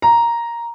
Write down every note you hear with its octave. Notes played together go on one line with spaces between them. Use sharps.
A#5